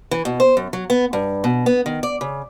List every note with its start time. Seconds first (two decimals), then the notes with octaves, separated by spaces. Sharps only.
0.11 E3
0.25 B2
0.40 C5
0.57 F#2
0.73 F#3
0.90 B3
1.13 G2
1.44 B2
1.66 B3
1.86 D#3
2.03 D5
2.21 C#3